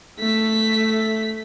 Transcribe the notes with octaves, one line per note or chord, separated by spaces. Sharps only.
A3 B6